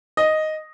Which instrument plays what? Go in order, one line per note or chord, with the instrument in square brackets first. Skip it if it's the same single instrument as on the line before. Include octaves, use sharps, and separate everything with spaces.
[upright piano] D#5